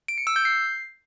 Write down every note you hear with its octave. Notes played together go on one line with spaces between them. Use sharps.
D7
C#7
E6
G6
C7